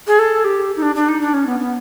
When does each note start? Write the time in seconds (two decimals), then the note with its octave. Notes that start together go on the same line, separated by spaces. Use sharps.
0.07 G#4
0.19 A4
0.44 G4
0.77 D#4
0.82 D4
0.96 D4
1.09 D#4
1.21 D4
1.34 C#4
1.47 B3
1.60 B3